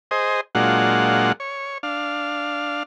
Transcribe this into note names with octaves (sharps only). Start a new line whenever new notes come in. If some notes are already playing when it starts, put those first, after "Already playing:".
G#4 C5 D#5
A#2 F#3 G#3 D4 F4 F#5
C#5
D4 F5